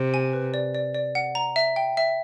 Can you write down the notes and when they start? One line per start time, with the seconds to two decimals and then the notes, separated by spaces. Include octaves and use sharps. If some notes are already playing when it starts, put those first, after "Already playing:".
Already playing: C3
0.14 G#5
0.33 B4
0.54 D5
0.75 D5
0.95 D5
1.15 F#5
1.35 A#5
1.56 E5
1.76 G5
1.97 E5